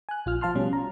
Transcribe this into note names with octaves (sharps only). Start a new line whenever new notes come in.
G#5 F#6
A#1 F4 F6
F3 F5 A5 C6 F6
B2 G3 C#4
A#5